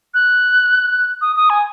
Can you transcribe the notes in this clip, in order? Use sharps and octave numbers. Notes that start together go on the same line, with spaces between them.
F#6
D#6
D#6
G#5